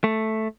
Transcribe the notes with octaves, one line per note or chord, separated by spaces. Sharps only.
A3